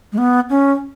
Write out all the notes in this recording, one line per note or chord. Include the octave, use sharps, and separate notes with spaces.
G#3
B3
C#4